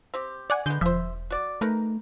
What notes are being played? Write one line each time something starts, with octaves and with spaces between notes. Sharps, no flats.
C4 G4
D5 F#5 G#5
D3 G#3 B3 G6
E1 F3 C5 E5
F#4 D5
A3 D#4 A#4 B4